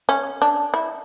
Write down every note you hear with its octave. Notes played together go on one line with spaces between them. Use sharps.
C#4
D4
E4